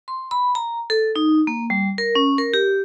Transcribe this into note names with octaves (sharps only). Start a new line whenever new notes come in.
C6
B5
A#5
A4
D#4
A#3
G3
A#4
C#4
A#4
G4